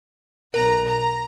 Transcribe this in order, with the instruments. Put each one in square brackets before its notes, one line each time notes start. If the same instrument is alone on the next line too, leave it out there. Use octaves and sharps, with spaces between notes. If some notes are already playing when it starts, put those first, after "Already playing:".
[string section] B1 A#5 [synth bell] A#4
[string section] A#5